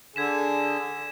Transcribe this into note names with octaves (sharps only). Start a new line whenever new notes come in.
D3 G#4 G#6 B6 E7